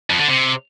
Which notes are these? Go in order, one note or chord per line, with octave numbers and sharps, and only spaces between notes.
F2
D3
C3